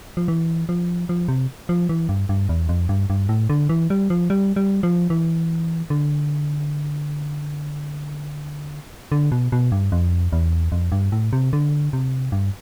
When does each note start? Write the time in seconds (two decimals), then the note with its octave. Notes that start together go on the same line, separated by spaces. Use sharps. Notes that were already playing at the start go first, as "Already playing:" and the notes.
0.17 F3
0.28 E3
0.69 F3
1.09 F3
1.28 C3
1.69 F3
1.89 E3
2.09 G2
2.29 G2
2.49 E2
2.69 F2
2.89 G2
3.10 G2
3.29 A2
3.50 D3
3.69 E3
3.90 G3
4.10 F3
4.30 G3
4.56 G3
4.83 F3
5.10 E3
5.90 D3
9.12 D3
9.32 B2
9.52 B2
9.72 G2
9.92 F2
10.33 E2
10.72 F2
10.92 G2
11.12 A2
11.33 C3
11.53 D3
11.93 C3
12.32 G2